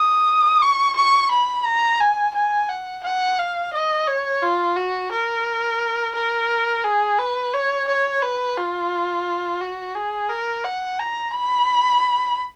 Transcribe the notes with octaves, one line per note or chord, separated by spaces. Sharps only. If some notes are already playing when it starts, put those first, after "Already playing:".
Already playing: D#6
C#6
C#6
B5
A#5
G#5
G#5
F#5
F#5
F5
D#5
C#5
F4
F#4
A#4
A#4
G#4
B4
C#5
C#5
B4
F4
F#4
G#4
A#4
F#5
A#5
B5